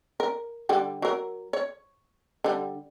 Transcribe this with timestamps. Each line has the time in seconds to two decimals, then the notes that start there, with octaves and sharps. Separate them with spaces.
0.20 A#4
0.69 D3 G3 G4
1.02 F#3 A#4
1.53 C#5
2.44 D3 G3